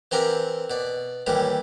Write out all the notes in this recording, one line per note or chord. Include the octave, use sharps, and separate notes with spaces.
E3 C4 G4 A#4 F#5 D6
B2 D5
D#2 A2 E3 G3